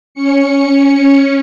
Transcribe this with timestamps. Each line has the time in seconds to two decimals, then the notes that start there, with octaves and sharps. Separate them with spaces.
0.14 C#4 C#7